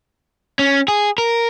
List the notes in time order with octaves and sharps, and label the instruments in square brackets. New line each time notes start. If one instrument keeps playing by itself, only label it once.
[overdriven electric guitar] C#4
G#4
A#4